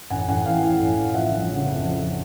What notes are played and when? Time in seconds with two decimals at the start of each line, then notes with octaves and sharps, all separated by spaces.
0.10 A1 F#5 G#5
0.28 A1 F#5 G#5
0.46 E3 F5 G5
0.62 A2
0.80 A1
0.97 A1
1.14 F3 E5 F#5
1.31 G1
1.50 C#3
1.66 F2
1.84 F3